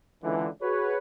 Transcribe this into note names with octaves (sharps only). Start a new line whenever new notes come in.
C#2 D3 E3
F#4 G#4 B4 C#5